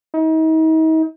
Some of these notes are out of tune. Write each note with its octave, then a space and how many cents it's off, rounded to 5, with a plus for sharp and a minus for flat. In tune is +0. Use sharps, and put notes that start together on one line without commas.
D#4 +40